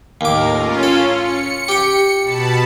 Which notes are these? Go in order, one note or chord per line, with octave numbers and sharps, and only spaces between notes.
D#2 A2 A#4 D6
C#4 F4
A4
C#7
G4 G5
B2 A5 B5